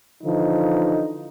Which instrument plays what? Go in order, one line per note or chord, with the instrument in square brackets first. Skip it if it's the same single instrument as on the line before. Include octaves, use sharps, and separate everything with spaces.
[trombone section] D3 E3 F3 D#4